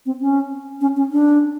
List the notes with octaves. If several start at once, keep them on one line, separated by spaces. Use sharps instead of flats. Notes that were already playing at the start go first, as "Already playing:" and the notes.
C4
C#4
C#4
C#4
D4